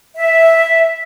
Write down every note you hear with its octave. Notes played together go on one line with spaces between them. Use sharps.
E5